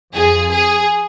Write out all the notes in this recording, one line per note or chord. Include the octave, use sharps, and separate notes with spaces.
F2 F3 G#4
G#4